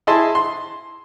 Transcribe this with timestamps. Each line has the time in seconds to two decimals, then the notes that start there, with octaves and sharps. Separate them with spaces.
0.07 E4 G#4 D#5 A5 C6
0.35 C6